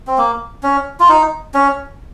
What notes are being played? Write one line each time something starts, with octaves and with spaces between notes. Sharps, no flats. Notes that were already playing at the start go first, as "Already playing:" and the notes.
C4
A#3
C#4
F4
D#4
C#4